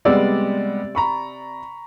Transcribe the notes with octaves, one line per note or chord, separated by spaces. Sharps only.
C3 G3 G#3 B3 D5 E6
A#5 B5 C#6